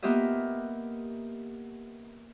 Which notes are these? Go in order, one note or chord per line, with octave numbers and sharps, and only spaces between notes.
A#3 B3 F4 G4 D#5 E5